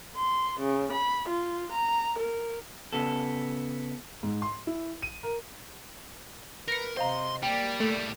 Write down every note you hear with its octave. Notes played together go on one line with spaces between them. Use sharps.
C6
C#3
B5
F4
A#5
A#4
C#3 B3 A4
G#2
C6
E4
D#7
A#4
A#4 B4 A#6 C#7
C3 C5 D#5 F5 A#5 C6
G3 A#3 D5 G5
A2 G3 A3